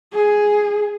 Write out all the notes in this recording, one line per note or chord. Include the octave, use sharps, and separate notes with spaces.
G#4